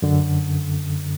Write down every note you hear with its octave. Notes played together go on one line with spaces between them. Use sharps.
F#2 D3